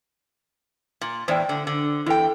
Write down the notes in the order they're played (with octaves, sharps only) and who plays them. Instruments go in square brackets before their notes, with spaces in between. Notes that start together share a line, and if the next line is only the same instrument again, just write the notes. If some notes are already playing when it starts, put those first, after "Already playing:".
[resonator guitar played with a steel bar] A#2
[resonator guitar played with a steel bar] E2 A2 [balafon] C5 D5 G5
[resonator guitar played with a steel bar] D3
D3
[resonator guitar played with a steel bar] E2 G5 [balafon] E4 A4